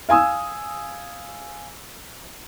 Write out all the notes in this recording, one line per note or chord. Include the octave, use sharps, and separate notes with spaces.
F5 G#5 D#6 E6